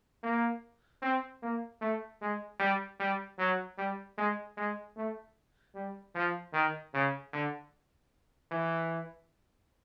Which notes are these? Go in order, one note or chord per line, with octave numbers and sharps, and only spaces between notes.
A#3
C4
A#3
A3
G#3
G3
G3
F#3
G3
G#3
G#3
A3
G3
F3
D#3
C#3
D3
E3